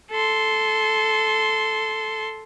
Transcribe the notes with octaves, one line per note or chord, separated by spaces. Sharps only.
A4 C6